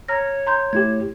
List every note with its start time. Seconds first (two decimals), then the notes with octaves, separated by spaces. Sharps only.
0.08 C#5 A#5 F6 A#6
0.47 A#5 C6 G6
0.73 A3 E4 G4 G#6